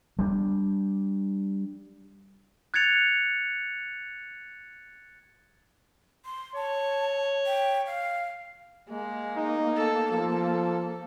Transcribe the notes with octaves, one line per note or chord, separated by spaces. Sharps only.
G3 D4
F#6 G#6 A6 C#7 F7
C6
C#5 A5
G5
F5
G#3 A#3
D#4
A4
F3 A4